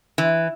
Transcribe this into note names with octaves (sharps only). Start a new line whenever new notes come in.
E3